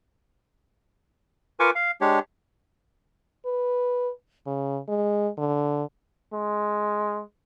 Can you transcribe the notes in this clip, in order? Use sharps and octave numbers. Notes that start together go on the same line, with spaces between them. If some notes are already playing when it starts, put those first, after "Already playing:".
F4 A#4 B4 G#5 C#6 D6
F5
G#3 D4 G4 C#5
B4
C#3
G#3
D3
G#3